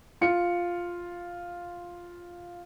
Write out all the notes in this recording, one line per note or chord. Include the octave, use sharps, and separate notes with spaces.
F4 C#7